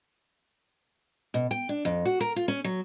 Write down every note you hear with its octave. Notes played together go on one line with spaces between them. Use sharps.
B2
G5
D4
F2
F#4
A#4
F4
C#4
F#3